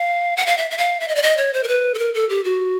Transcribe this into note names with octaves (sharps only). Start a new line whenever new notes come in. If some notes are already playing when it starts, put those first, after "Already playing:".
Already playing: F5
F#5
F5
E5
E5
F5
E5
D#5
D5
D#5
C#5
C5
A#4
B4
A4
A#4
A4
G4
F#4